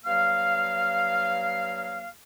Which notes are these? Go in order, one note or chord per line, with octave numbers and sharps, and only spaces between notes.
G2 F#3 A#3 F5